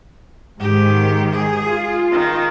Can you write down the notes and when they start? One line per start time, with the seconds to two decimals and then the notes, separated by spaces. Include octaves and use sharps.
0.60 G#2 D#3 G4
1.32 G#4
1.65 F4
2.12 D#3